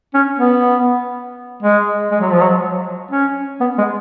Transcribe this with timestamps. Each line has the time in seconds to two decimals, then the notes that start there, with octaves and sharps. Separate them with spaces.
0.14 C#4
0.39 B3
1.63 G#3
2.11 G#3
2.21 F#3
2.31 F3
2.40 F#3
3.11 C#4
3.60 B3
3.78 G#3